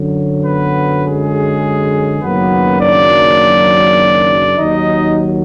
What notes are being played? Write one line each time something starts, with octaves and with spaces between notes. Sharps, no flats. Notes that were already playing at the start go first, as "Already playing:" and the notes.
Already playing: F#2 D3 F#3
B3 B4
G#3 G#4
F#1 F#2 D#3 F#3 A#3 B3 B4
D4 D5
D#2 D#3 F#3 D#4 D#5